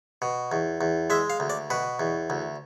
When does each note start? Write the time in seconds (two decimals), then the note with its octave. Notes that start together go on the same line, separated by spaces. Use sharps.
0.22 B2
0.52 E2
0.81 E2
1.10 G#3 E5
1.30 F5
1.40 D2
1.50 D5
1.70 B2 B4
2.00 E2
2.30 D2